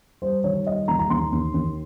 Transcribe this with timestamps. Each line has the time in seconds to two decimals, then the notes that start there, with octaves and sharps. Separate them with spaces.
0.22 G3 C5
0.44 D#3 C#5
0.66 G3 D#5
0.88 D#2 A#5
0.99 A#5
1.10 D#2 C6
1.32 D#2
1.54 D#2